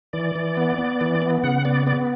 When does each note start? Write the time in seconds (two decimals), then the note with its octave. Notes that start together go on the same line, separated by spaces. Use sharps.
0.13 E3 D5
0.36 E3
0.57 B3
0.78 B3
1.01 E3
1.22 B3
1.43 C#3 F#5
1.65 B3 D5
1.87 B3 D5